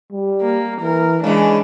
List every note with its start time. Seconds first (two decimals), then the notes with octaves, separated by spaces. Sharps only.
0.12 G3
0.42 A#3
0.81 E3 A#4
1.24 C#3 E3 G#3 D4